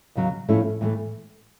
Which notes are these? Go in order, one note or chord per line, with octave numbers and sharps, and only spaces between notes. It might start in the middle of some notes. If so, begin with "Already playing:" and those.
D#2 C#3 F#3
A2 F3 A3 C#4 E4
A2 E3 A3